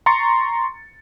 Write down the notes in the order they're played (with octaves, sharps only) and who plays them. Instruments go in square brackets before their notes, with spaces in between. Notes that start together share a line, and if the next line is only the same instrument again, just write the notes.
[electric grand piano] A#5 C6 C#6 A6 C#7